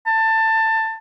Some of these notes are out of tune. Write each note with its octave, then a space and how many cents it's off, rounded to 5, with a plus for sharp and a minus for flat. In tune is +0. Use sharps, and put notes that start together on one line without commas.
A5 +20